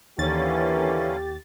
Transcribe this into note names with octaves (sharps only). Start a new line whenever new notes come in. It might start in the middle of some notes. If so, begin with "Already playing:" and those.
D#2 D3 E3 A#3 C#4 G4 A6